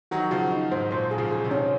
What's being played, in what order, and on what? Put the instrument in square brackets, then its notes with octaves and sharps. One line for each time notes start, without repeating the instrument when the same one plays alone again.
[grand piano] D#3 F#3 [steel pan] F#4
[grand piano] C#3 F3 [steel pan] F#4
[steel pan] D#4
[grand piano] G#2 [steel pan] C5
[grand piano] A#2 [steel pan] C5
[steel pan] G#4
[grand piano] C#3 F3
[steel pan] G#4
[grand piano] C3 D#3
[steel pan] C#4